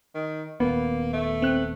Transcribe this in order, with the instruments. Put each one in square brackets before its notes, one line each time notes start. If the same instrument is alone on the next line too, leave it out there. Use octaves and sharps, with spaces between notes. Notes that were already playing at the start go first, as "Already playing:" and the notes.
[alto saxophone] D#3
[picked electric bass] D#1 B3 [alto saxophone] A#3
[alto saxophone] A3
[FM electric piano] C4 F#6